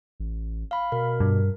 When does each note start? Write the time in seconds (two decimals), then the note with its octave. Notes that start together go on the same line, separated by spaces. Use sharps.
0.20 A1
0.71 F5 B5
0.92 B2 A#4
1.20 G2